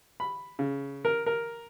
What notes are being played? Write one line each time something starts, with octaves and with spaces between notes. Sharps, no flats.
B5
C#3
A#4
A#4